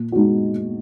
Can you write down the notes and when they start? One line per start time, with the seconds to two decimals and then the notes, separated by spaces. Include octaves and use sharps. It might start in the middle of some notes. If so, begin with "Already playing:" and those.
Already playing: A#2
0.12 G#3 D#4 F#4